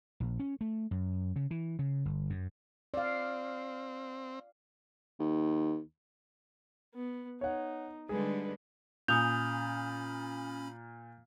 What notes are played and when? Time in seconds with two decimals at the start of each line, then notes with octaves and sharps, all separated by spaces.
0.20 A#1
0.39 C#4
0.61 A3
0.91 F#2
1.36 C#3
1.51 E3
1.79 C#3
2.05 G1
2.30 F#2
2.94 C4 D5 F5
5.20 D#2
6.94 B3
7.41 D#4 C#5 F#5
8.09 D3 G3 G#3 G#4 B4
9.08 A#2 C#4 G#5 B5 D#6 G6 F7